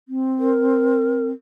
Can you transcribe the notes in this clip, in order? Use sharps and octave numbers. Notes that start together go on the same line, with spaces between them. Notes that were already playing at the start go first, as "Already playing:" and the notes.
C4
A#4